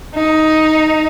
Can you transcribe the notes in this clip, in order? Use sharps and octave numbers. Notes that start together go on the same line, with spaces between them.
D#4